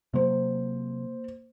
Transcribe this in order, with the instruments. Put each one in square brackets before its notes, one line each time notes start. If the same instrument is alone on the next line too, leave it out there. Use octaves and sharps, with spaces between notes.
[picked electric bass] C3 F#3 [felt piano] A#3 C5